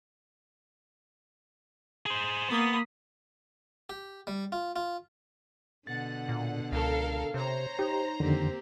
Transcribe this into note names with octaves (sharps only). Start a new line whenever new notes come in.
G#4 C5
A#3 B3 D#6
G4
G3
F4
F4
B2 D3 F#5 A6
A#2
C#2 A4 A#4 F5
C3 C5 C#5 A#5
D#4 G4
F2 D3 D#3 A#3 C4 G4